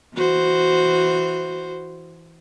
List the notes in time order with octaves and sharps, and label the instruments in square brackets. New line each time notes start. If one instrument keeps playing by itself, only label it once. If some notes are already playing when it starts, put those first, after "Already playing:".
[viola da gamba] E3 F#4 C5